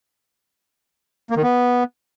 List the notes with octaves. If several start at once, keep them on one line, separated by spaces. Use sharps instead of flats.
A#3
D#3
B3